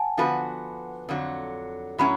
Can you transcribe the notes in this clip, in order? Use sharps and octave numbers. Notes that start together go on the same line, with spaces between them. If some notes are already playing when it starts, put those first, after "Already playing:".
Already playing: F#5 G#5 A5
D3 F3 B3 F#4 B4
F2 D3 F#3
A2 F#3 C#4 B5